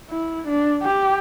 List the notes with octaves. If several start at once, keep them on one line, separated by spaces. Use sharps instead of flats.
E4
D4
G4